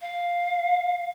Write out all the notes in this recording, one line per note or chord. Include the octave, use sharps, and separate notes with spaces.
F5